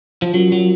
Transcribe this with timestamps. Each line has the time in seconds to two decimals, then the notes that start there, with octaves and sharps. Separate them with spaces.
0.22 F3
0.34 F#3 C#4 F4 A#4
0.52 F#3